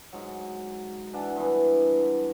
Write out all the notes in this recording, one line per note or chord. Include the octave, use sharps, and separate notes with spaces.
G#2 F#3
E3 D4 F#5 A5
G2 E3 B3 E4